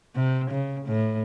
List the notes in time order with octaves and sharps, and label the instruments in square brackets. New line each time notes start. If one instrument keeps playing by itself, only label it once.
[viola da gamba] C3
C#3
A2